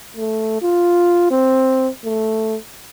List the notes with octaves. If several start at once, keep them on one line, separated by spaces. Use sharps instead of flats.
A3
F4
C4
A3